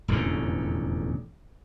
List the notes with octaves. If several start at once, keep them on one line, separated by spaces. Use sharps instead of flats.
E1 A1 F2 D3